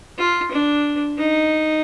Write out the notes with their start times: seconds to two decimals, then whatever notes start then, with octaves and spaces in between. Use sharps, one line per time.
0.18 F4
0.51 D4
1.18 D#4